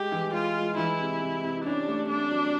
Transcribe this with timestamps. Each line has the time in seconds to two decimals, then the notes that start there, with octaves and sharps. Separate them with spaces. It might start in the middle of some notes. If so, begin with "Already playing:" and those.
Already playing: G#3 G4
0.12 E3
0.33 G#3 F4
0.55 G#3
0.77 E3 E4
1.00 C3
1.22 C3
1.43 C3
1.65 C#4 D4
1.88 A3
2.09 A3 D4
2.31 F#3